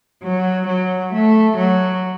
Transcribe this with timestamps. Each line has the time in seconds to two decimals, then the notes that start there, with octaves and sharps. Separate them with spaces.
0.22 F#3
0.68 F#3
1.13 A3
1.57 F#3